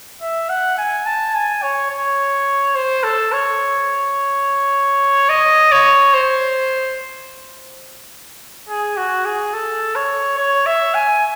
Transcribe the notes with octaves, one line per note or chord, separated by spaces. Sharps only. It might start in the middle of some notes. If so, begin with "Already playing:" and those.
E5
F#5
G#5
A5
G#5
C#5
C#5
C5
A4
C#5
D#5
C#5
C5
G#4
F#4
G#4
A4
C#5
C#5
E5
G#5